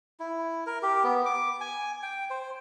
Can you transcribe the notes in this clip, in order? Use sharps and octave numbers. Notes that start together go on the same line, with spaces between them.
E4
A#4
G4
B3
D6
G#5
G5
C5